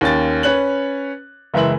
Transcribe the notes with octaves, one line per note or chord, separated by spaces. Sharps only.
D#2 C#4 A6
C#4 B4 C#5 F#6 F#7
F#1 E3 G#3 E5 F#7